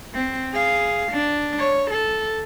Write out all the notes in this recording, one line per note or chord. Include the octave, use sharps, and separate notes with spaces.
C4
G#4 F5
D4
C#5
A4